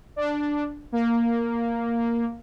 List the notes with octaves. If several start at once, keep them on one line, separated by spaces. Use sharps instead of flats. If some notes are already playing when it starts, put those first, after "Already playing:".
D4
A#3